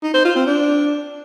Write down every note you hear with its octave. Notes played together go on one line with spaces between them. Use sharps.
D#4
C5
F4
C4
D4